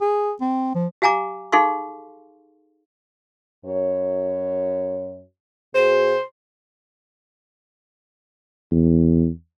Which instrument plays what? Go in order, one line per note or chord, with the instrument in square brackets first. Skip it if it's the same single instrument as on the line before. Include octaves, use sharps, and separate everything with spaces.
[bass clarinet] G#4
C4
F3
[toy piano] G4 F5 G#5 A#5 D6
D#4 G#4 A4 F5 C6 C#6
[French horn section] F#2 C#5
[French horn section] B2 F#4 G#4 [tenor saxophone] C5
[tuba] E2